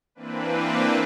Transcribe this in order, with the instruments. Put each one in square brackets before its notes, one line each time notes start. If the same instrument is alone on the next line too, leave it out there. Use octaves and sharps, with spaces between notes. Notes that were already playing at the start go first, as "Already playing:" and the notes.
[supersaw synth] E3 A#3 C4 D4 B4